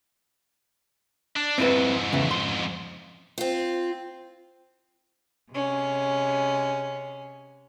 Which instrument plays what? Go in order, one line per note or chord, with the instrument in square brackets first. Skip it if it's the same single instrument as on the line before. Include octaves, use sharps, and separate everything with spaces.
[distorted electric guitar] D4
[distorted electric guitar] F2 G#2 [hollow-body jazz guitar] C4 E4 B4
[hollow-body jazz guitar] E2 C#3 E3
C6
[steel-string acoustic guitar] C4 F4
[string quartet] C3 G#3 C#4